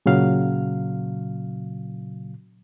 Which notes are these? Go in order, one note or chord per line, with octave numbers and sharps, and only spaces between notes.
A#2 C#3 F#3 F5